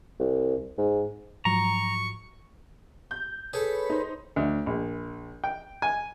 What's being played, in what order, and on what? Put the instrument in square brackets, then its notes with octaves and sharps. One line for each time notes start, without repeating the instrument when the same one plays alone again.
[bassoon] C2
G#2
[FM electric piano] G#2 F3 F#3 [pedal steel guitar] A#5 [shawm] C#6
[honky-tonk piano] G6
[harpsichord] G#4 A4 [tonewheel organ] B4 C#5 B5
[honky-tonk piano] D#4 C5
[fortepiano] D2
A#1
G5
G#5